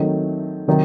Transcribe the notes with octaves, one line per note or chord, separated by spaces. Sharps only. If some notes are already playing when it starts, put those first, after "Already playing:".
Already playing: D#3 F#3 A3 C4 D#4
C3 D#3 F#3